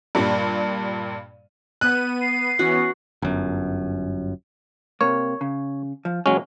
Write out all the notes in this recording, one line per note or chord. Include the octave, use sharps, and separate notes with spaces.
G2 A#2 G3
B3 F#6 D#7
C7
E3 B3 C#4 F#4 F#5
G1 F#2
C3 A#3 C#5
C#3
F3
E2 A#2 F#3 G#3 C#4